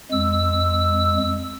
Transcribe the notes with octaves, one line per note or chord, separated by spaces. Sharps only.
F2 G#3 E6